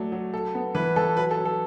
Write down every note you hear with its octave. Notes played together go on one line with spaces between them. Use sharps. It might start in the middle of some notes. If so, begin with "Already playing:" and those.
Already playing: F#3 A3 D4
F#3
A4
B3
E3 B4
E3 A4
F#3 B4
A4
F#3
A4